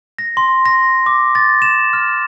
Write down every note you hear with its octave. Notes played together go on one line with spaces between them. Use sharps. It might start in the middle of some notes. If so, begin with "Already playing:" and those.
A#6
C6
A#6
D6
A6
E7
F6